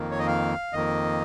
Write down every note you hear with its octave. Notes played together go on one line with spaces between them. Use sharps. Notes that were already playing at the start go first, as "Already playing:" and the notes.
Already playing: F2 D#3 A#3
C#5
D#5
F5
F2 D#3 A#3 D#5